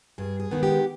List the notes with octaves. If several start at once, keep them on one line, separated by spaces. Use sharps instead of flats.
G2 G#4
G#4
D#3 G#3 B3
G4